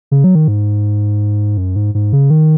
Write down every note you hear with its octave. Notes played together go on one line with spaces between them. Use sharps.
C#3
F#3
D#3
G#2
F#2
G#2
G#2
C#3
D#3